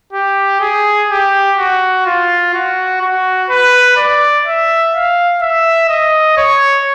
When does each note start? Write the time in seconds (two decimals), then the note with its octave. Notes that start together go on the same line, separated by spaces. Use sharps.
0.12 G4
0.60 G#4
1.09 G4
1.58 F#4
2.06 F4
2.54 F#4
3.01 F#4
3.50 B4
3.97 D5
4.45 E5
4.93 F5
5.42 E5
5.89 D#5
6.37 C#5